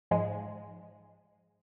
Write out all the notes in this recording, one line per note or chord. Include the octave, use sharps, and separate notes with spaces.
G#2 F3 G#3